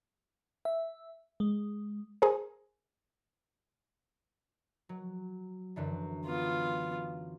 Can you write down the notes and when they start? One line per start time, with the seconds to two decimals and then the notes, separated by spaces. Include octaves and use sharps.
0.65 E5
1.40 G#3
2.22 G#4 A#4 C5
4.89 F#3
5.76 F#2 D3 E3
6.26 B3 F4